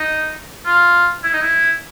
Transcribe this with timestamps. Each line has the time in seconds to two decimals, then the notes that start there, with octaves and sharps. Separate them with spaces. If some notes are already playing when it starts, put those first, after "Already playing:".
Already playing: D#4
0.66 F4
1.24 E4
1.33 D#4
1.42 E4